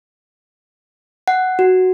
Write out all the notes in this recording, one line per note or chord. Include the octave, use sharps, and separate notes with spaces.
F#5
F#4